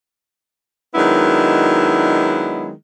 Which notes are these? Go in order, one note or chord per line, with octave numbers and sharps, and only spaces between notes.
D#3 F#3 G#3 B3 D4 E4